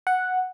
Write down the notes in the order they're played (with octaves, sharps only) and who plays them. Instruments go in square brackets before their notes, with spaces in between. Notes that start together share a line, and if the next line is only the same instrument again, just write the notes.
[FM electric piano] F#5